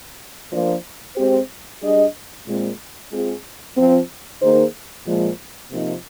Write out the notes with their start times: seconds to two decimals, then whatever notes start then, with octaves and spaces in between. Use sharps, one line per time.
0.52 F3 A#3 D4
1.16 G#3 C4 G4 C5
1.82 G3 D4 G#4 D#5
2.47 A#2 G#3 C4
3.11 G#3 C4 F4 G#4
3.77 F3 C4 F4
4.41 D#3 A#3 D#4 G#4 C5
5.06 A#2 F3 G#3
5.71 C3 F3 A#3 D#4